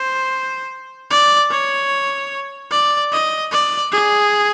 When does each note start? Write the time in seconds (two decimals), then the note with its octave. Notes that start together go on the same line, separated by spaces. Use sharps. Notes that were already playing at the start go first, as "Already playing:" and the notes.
Already playing: C5
1.10 D5
1.50 C#5
2.71 D5
3.12 D#5
3.52 D5
3.92 G#4